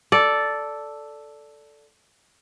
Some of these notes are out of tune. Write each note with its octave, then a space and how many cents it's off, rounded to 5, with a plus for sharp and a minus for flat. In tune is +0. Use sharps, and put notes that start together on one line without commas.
A4 +0 D5 -5